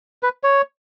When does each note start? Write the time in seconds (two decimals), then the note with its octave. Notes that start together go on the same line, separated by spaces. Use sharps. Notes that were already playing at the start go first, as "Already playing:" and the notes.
0.23 B4
0.43 C#5